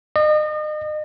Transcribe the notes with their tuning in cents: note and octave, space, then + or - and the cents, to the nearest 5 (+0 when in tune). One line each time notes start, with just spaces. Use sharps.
D#5 -35